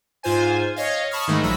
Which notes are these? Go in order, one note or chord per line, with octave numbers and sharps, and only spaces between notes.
G#2 F4 C5 G#5
C#5 D#5 F5
A5 B5 C#6 D#6 F6
G#2 D#3 G#3 A3
A#1 F#3 B5 E6